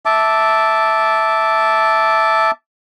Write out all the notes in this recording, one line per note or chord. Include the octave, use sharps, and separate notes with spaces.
E5 A5 D6